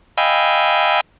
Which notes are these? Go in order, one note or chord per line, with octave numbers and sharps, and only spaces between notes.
D#5 F5 G5 G#5 B5 E6